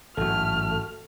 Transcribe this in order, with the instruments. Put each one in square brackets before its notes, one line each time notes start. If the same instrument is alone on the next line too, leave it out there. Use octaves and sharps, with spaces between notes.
[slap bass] A1 G#2 F#3 [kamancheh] A3 F6 [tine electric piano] F#4 A4